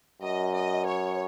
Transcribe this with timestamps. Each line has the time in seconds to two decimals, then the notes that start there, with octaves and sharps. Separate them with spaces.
0.22 F#2 D#5
0.53 D#5
0.85 C#5